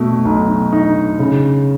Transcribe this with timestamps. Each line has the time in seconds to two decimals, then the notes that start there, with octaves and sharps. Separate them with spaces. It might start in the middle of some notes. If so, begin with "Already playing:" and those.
Already playing: B2 A3
0.25 B1
0.72 D#4
1.19 C#3